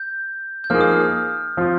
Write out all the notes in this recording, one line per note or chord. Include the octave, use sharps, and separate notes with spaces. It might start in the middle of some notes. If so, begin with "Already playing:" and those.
Already playing: G6
G6
F3 A#3 D#4 G#4 F6
D#6
F6
F3 C4 F4